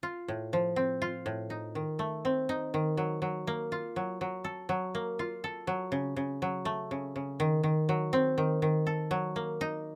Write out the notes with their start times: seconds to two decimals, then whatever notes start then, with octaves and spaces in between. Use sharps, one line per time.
0.03 F4
0.28 A2
0.53 F3
0.76 C4
1.02 F4
1.26 A2
1.50 D#4
1.75 D#3
1.99 A3
2.25 C4
2.49 D#4
2.74 D#3
2.97 F#3
3.22 F#3
3.47 A#3
3.72 F4
3.96 F#3
4.21 F#3
4.44 A4
4.69 F#3
4.95 A#3
5.19 F4
5.44 A4
5.67 F#3
5.92 C#3
6.16 C#3
6.42 F#3
6.65 A3
6.91 C#3
7.16 C#3
7.40 D#3
7.64 D#3
7.89 F#3
8.13 C4
8.38 D#3
8.62 D#3
8.87 A4
9.11 F#3
9.36 A#3
9.61 D#4